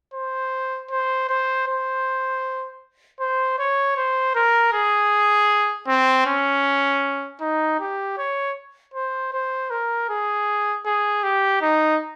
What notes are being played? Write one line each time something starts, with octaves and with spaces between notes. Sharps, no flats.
C5
C5
C5
C5
C5
C#5
C5
A#4
G#4
C4
C#4
D#4
G4
C#5
C5
C5
A#4
G#4
G#4
G4
D#4